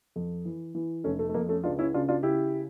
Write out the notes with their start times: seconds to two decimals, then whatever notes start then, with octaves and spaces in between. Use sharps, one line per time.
0.16 F2
0.45 E3
0.75 E3
1.04 F1 A3 C#4
1.19 A3
1.29 A3
1.34 F2 A#3
1.49 A3 C#4
1.64 C#2 D4 F4
1.79 C#4 E4
1.94 C#3 D4 F4
2.09 D4 F4
2.23 C#3 E4 G4